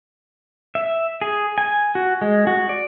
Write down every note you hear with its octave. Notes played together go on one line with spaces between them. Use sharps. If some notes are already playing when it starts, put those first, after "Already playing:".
E5
G#4
G#5
F#4
G#3
F#4
D5